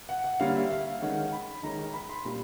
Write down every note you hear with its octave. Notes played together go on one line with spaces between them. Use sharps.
F#5
F#5
D3 G3 A#3 C#4 F5
E5
F5
D#3 G#3 C#4 F#5
B5
D#3 G#3 C#4 A#5
A#5
B5
C6
A#2 G3 B5